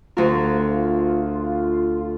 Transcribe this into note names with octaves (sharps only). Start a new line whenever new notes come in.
D2 F4 A#4